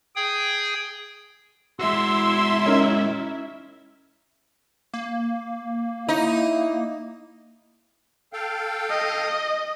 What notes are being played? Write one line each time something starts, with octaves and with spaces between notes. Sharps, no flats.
G#4 G5 D#6
G#3 E4 F#4 E5 C6 E6
C#4 D#4 A#4
A#3
D#4 E4
A4 F5 G5
D#5